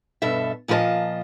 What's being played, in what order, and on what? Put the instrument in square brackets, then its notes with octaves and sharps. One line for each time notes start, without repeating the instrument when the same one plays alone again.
[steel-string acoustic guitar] G2 B2 A4 E5
A#2 F3 F4 B4 D#5 A5